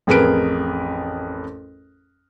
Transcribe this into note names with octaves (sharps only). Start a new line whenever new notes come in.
A1 F2 G#4 A#4 B4 D7